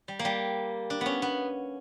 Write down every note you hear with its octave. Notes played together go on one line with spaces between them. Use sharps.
G3
A#3
G3
D4
B3 C#4
B3